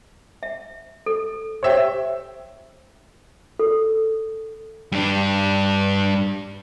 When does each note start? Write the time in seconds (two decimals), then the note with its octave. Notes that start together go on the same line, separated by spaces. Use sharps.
0.43 E5
1.06 A4
1.63 G4 C5 C#5 E5 G5
3.59 A4
4.92 G2 D4